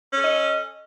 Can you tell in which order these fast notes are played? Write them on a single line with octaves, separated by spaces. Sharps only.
C#4 A4 D#5